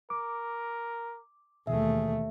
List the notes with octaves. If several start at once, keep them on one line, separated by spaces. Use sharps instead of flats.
A#4 D6
D#2 B2 E3 A3 G#4 E5